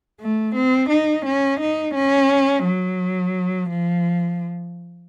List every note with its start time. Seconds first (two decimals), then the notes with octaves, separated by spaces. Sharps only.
0.20 A3
0.55 C4
0.90 D#4
1.26 C#4
1.60 D#4
1.95 C#4
2.64 F#3
3.69 F3